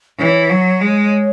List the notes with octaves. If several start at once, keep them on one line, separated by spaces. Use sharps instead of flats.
E3 C#5
F#3
G#3